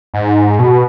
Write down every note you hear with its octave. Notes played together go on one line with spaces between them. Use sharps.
G#2
B2